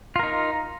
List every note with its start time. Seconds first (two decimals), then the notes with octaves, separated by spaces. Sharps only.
0.16 F4
0.19 A#4
0.23 D#4